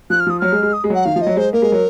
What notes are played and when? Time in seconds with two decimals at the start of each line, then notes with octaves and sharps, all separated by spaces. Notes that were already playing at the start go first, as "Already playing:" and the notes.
0.10 F3 F#6
0.20 F6
0.27 F3 D#6
0.40 F#3 F6
0.52 G#3
0.63 G#3
0.73 D#6
0.84 G#3
0.90 F#3 F#5
1.05 D#3 F5
1.16 F3
1.22 D#5
1.27 F#3
1.36 G#3 C5
1.53 A#3 A#4
1.62 G#3
1.72 F#3